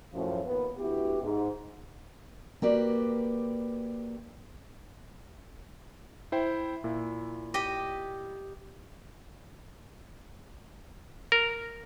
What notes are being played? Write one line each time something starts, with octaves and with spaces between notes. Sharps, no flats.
F#2 A2 F3
D#2 B3
D2 B3 E4 F#4 G4
G#2
A#3 F#4 G4 B4 D5
E4 C5 G5
A#2 E4
G4 D#5
A#4